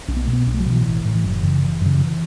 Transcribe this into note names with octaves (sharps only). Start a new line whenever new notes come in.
B1 C#4
B3
B2 A3
B3
B1 C#4
A3
F#3
B2
E3
A1
A2
E3
F#1 F#3
F#2 C#3 E3
F#1 E3
F#2 C#3 F#3
E3